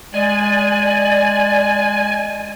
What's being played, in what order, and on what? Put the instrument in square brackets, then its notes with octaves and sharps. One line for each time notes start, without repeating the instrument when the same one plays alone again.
[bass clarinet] G#3 [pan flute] D5 [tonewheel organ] G#5